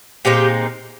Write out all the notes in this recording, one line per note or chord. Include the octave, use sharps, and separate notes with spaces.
A#2 G#3 C4 D#4 G4